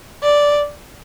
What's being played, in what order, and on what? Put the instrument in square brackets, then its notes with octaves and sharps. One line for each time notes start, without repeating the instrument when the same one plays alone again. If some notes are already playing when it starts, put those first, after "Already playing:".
[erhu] D5